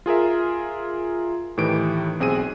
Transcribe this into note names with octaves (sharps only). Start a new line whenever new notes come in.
F4 G#4 A#4 E5
A2 D#3 E3 G4 D7
B1 C4 G#4 D#7